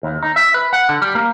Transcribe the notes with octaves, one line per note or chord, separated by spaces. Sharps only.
D#2
D#4
E5
B4
F#5
D3
G3
A#3